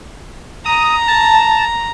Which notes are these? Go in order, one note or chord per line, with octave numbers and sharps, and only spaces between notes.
A#5 D#6
A5